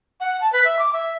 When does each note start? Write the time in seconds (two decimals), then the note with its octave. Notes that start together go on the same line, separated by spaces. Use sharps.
0.20 F#5
0.41 A5
0.53 B4
0.65 E5
0.79 D6
0.93 E5